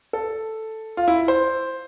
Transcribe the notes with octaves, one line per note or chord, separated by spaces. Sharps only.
A4
F4
E4
C5